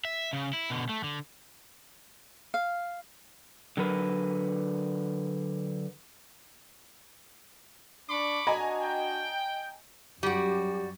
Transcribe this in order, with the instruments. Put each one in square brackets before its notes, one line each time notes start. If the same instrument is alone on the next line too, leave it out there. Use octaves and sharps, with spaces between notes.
[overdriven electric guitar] E5
C#3
E4
B2 D3
A3
D3
[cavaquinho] F5
[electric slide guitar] D3 F#3 A#4 B4
[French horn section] D4 [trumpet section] B5 C#6 D6
[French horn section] D4 F#4 [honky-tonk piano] D#5 G#5 A#5
[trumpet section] G5
[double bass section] F#2 [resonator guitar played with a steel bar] G3 F#4 [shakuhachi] G4